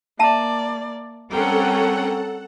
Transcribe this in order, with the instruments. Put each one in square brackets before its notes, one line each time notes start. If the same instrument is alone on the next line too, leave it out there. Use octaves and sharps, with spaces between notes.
[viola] A#3 D5 [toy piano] E5 A5 A#5
[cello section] G3 C4 C#4 [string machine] A4 F#5 [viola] A#4 G5